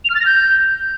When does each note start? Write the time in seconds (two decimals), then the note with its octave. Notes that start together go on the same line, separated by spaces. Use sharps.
0.05 F7
0.10 F6
0.15 A6
0.20 A#6
0.26 G6